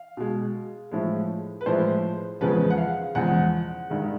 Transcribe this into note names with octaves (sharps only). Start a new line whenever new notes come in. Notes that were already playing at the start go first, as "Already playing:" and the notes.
Already playing: F5
B2 G#3
A2 F3 G#3
B4
A2 F3 G#3 C5
E2 C#3 F3 G#3 B4
F#5
F5
E2 C#3 F3 G#3 F#5
G2 D#3 G#3